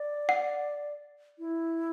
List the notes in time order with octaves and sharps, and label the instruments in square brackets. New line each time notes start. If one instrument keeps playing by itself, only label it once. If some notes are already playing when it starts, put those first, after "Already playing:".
Already playing: [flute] D5
[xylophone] F#5
[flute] E4